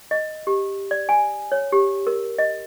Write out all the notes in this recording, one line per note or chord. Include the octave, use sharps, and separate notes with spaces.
D#5
G4
D5
G#5
C#5
G4
A#4
D#5